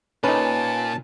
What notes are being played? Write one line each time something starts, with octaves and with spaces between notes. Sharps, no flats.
A#2 C#4 D#4 B4 A5